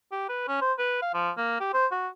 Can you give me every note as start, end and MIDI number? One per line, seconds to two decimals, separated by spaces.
0.12 0.29 67
0.29 0.46 71
0.48 0.57 61
0.61 0.73 72
0.79 0.97 71
1.02 1.09 77
1.14 1.31 53
1.37 1.60 58
1.60 1.70 67
1.74 1.87 72
1.92 2.08 66